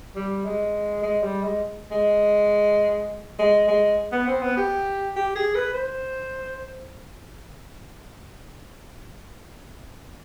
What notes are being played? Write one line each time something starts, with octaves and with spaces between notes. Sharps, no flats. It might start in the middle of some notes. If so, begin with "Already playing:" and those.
G3
G#3
G#3
G3
G#3
G#3
G#3
G#3
B3
C4
B3
G4
G4
G#4
B4
C5